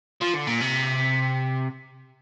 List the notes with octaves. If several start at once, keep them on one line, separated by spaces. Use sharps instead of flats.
F3
D3
A#2
C3